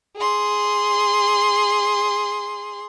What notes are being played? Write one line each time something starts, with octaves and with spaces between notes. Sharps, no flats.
G#4 C6